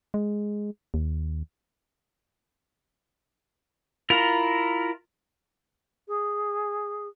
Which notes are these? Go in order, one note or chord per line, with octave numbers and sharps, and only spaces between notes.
G#3
D#2
E4 F4 A#4 A#5
G#4